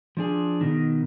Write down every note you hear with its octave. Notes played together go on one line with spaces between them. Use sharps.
F3 D4 G#4
B2 D#3